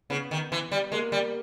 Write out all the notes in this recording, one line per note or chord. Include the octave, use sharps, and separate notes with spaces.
C#3 B3
D#3
E3
G3
G#3 A#3
G3